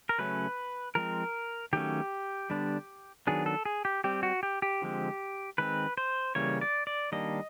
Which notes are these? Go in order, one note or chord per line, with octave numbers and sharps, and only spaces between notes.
A#4
C#3 F#3 A3 C#4 B4
F3 G#3 C4 A#4
D#3 F#3 A3 C#4 G4
D3 G3 B3 D4
D#3 F#3 B3 D4 G#4
A4
G#4
G4
G3 C4 G4
F#4
G4
G4
D3 F3 G#3 C4
D#3 G#3 C4 B4
C5
C#3 E3 G3 A#3 C#5
D5
D5
D#3 G3 A#3 D4 D#5